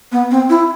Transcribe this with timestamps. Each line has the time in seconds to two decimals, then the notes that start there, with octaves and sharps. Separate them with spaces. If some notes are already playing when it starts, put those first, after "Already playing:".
0.12 B3
0.31 C4
0.50 E4